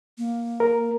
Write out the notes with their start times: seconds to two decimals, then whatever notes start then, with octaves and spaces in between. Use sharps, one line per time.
0.18 A#3
0.60 A#4